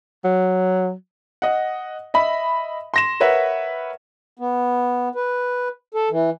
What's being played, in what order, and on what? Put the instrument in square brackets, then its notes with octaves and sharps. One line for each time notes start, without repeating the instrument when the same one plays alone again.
[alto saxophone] F#3
[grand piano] D#5 F#5
D#5 E5 B5
C6 A#6 E7
A#4 B4 C#5 E5 F#5
[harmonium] B3
B4
A4
E3